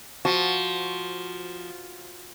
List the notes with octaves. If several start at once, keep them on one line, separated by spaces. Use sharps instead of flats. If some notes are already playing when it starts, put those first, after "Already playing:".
F3 F#4